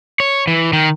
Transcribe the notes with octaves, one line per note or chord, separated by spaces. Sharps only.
C#5
E3
D#3